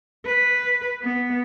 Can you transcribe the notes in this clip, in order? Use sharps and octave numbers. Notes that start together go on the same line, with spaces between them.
B4
B3